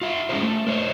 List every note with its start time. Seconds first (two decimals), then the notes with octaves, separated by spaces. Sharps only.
0.01 F4 E5
0.29 G#3 C#4 F4 G#4 A#4 C5
0.43 A3
0.67 A#4 C5 C#5